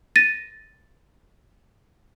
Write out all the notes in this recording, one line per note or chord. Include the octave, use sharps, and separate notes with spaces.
A6 A#6 D#7